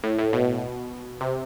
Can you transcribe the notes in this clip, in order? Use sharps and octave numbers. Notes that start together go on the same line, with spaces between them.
A2
A2
B2
C3